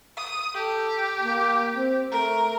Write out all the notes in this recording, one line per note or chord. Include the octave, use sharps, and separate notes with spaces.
D#6
G4 A4
A#3
C4
A3 A#4